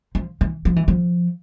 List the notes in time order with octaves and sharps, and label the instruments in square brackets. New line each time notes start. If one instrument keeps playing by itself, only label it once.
[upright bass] F3
E3
F3
E3
F3